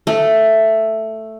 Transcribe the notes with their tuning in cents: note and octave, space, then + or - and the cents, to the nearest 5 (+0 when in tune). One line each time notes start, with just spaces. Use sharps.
A3 +5